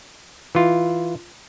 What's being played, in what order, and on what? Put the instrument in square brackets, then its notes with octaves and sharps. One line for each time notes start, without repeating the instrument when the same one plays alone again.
[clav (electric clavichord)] E3 F4